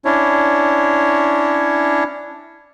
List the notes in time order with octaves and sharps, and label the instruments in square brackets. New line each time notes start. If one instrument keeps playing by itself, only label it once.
[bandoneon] C#4 D4 E4 C#5